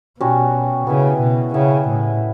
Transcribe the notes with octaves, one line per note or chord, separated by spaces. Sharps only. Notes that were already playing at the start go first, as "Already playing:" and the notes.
B2 G3 C#4 F#4
C#3 B3 E4 B4 E5
B2
C#3 B3 E4 B4 E5
A2